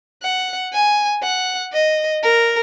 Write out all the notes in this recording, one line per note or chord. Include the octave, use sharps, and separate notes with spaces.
F#5
G#5
F#5
D#5
A#4